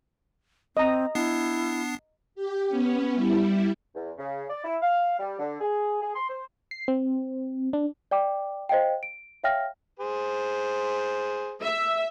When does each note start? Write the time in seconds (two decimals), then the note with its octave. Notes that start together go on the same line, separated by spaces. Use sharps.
0.77 C4 D#5 A#5
1.15 B3 D4 E4 C7
2.35 G4
2.68 B3 C#4
3.13 G3 E4
3.95 E2
4.18 C#3
4.50 D5
4.64 E4
4.81 F5
5.19 G3
5.39 D3
5.61 G#4
6.01 G#4
6.15 C6
6.30 C5
6.71 C7
6.88 C4
7.73 D4
8.11 D5 G5 D6
8.69 C5 D#5 F5 G5
9.03 D7
9.44 C#5 E5 F5 G5 F6 A#6
10.00 G#4 C5
11.61 E5